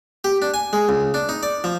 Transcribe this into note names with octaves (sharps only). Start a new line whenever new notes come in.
G4
D4
G#5
G#3
C#2
D4
D#4
D5
F3